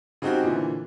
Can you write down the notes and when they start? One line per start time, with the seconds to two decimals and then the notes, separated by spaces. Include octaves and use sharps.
0.22 C#3 C4 D#4 F#4 G4
0.43 A#2 D3 E3